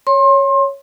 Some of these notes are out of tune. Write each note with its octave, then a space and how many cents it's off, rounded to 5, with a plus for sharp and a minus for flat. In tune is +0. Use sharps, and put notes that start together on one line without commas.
C#5 +0 C6 +30